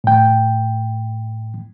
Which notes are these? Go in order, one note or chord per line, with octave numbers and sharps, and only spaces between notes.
A2 G5